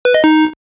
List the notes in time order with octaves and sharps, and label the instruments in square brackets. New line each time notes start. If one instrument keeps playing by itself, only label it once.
[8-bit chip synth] B4
D#5
D#4